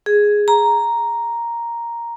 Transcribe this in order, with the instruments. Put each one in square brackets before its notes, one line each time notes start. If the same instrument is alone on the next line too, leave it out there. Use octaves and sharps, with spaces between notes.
[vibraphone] G#4
A#5